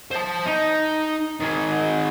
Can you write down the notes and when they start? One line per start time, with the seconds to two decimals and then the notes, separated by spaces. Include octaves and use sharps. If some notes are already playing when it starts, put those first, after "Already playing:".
0.11 C5 A5
0.46 D#4
1.40 D#3 G#4